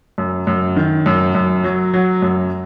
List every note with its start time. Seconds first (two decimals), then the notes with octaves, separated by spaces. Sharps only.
0.18 F#2
0.47 F#2
0.76 D#3
1.06 F#2
1.35 F#2
1.64 F#3
1.94 F#3
2.22 F#2